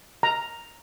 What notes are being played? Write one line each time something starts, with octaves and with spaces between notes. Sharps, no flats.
A#5